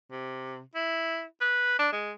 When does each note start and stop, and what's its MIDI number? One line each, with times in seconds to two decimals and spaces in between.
0.11 0.60 48
0.75 1.24 64
1.41 1.76 71
1.79 1.89 62
1.92 2.13 56